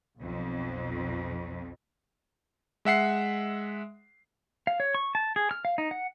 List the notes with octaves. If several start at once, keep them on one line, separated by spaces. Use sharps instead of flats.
B1 F2
G#3 E5 F#5 C7
F5
C#5
C#6
A5
G#4
F6
F5
D#4
F#5